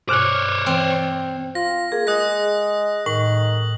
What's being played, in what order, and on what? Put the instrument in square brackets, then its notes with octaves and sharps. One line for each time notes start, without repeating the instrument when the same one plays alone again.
[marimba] G2 B2 [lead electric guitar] C5 C#5 [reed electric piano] D6 F6 F#6
[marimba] E3 [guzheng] C4
[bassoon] F4 [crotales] A#6
[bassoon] A#3 [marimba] G#4
[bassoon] G#3 [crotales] D#6 F#6 A#6
[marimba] A2 [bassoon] D#3 [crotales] F#7